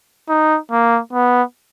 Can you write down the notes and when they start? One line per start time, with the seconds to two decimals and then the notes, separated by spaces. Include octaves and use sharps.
0.29 D#4
0.71 A#3
1.13 B3